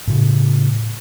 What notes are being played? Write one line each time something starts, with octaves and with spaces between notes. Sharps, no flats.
A2 C#3